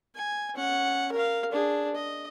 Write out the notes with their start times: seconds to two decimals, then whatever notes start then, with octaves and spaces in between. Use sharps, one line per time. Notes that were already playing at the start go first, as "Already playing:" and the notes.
0.15 G#5
0.54 C#4 F#5
1.12 A#4 F5
1.52 D4 G#4
1.95 D#5